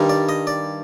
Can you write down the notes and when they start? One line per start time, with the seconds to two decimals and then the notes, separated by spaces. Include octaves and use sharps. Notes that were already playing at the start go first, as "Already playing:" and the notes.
Already playing: G2 D#3 G3
0.09 D5
0.29 D#5
0.47 D5